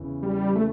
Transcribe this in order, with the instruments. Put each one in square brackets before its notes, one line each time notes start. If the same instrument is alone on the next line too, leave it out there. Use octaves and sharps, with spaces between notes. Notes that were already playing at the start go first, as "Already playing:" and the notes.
Already playing: [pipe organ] E2 C#3 E3
[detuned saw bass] G3
A3